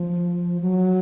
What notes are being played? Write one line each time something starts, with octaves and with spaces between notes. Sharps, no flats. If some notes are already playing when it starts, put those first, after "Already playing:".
Already playing: F3
F#3